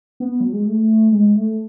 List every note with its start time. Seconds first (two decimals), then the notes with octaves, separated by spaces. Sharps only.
0.20 B3
0.40 F#3
0.53 G#3
0.66 A3
1.12 G#3
1.36 A3